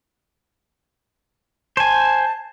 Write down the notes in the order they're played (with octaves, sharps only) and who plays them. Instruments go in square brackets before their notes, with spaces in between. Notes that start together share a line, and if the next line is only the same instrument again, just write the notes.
[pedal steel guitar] C5 G#5 [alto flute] A5